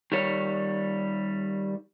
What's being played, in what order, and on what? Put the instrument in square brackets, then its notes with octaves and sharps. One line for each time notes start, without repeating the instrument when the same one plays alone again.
[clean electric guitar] D#3 G3 C#5